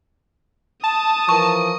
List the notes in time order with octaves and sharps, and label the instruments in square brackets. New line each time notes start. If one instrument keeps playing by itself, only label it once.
[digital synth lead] A5 [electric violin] D#6
[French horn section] E3 F3 A#4 [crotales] C#6